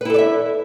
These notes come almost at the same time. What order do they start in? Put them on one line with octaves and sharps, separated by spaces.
B4 E4 A4 D5 E5